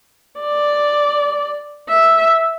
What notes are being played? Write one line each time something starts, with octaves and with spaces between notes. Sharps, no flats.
D5
E5